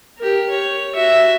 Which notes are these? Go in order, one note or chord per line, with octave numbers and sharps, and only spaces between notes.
G4 A#4
C#5
F#4 E5